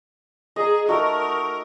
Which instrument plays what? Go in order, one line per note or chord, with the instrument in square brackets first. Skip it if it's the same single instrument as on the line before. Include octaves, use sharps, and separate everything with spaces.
[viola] G#4 [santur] D#5 A#5
[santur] A3 D#4 F#4 [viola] A#4